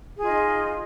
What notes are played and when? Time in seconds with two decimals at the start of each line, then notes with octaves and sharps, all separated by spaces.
0.18 G#4
0.21 F4
0.24 D#5
0.27 D#4